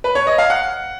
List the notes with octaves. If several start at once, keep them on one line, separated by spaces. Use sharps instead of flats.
B4
C#5
D#5
F5
F#5